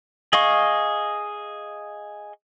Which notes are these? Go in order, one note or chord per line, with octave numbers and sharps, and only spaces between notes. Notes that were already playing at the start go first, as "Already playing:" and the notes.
G#4 D#5 F5 C#6